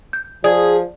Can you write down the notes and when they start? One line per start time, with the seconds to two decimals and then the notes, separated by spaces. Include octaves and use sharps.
0.13 G6
0.44 F3 G#4 D5